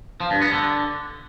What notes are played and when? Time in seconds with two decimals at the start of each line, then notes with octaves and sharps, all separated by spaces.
0.20 F3
0.31 G2
0.42 B3
0.52 D3